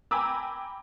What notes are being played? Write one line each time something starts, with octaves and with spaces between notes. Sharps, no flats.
G5 G#5 A#5 B5 D6 E6